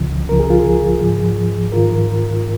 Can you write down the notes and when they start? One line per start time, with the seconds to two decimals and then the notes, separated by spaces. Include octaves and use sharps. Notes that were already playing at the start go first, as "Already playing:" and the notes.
Already playing: C#2 C#3 F3
0.29 C#2 C#3 F3 A#4
0.40 G#4
0.50 F4
0.60 G#4
1.02 G#2 F3
1.72 G#2 D#3 F4 A#4